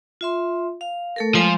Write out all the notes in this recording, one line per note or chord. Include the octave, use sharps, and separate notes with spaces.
F4 E5 C6
F5
A3 A4 A#4
F3 G#3 G#5